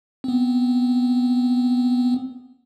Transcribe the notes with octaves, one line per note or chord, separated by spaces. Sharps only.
B3 C4